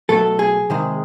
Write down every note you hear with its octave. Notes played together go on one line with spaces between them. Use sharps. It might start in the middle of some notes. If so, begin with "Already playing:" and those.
B2 F#3 A3 A4
G#4
C3 D#3 G#3